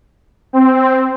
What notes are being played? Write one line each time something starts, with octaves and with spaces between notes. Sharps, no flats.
C4